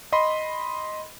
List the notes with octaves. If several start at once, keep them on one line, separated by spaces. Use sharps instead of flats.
D#5 B5 C6